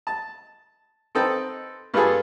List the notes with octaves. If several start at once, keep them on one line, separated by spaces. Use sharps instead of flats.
A5
C4 D#4 A4 B4 G5
G2 G3 F4 G#4 A4